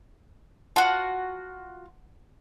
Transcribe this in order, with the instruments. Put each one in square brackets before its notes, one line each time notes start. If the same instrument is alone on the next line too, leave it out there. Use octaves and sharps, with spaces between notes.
[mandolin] F4 F#4 [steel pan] F#5 A5